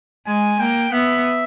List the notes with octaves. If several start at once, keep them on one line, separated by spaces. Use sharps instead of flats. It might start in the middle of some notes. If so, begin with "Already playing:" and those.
G#3 G#5
A#3 G5
B3 E5